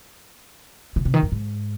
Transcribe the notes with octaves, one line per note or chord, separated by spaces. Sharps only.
C#3
C3
D#3
F2
G#2